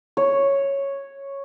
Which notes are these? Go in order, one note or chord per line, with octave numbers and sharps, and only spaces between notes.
C#5